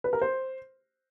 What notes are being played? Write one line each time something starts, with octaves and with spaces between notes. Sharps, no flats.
B4
A#4
C5